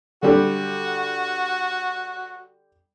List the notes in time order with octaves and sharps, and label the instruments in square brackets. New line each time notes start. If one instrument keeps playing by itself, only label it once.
[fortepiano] D3 G3 [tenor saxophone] F#4